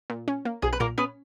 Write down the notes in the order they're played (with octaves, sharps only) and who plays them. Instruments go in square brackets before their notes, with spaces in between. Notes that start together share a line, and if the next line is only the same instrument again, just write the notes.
[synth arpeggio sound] A#2
C#4
A#3
[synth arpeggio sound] B1 [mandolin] G#4
[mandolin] B4
[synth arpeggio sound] A#2 [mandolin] A#3 A#4
[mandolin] B3 B4 [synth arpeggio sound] C#4